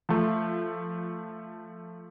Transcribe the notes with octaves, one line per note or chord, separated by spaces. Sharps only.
F3 A3